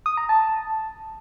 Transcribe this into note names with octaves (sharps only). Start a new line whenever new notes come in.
D#6
A#5
A5